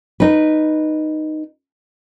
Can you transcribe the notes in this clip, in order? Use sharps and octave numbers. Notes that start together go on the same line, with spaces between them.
D#4 B4